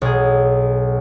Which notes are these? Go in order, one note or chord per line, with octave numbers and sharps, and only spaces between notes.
B1 G#4